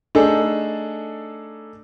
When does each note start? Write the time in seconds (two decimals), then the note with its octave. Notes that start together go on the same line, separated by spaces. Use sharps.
0.15 A3 D4 D#4 G#4 A4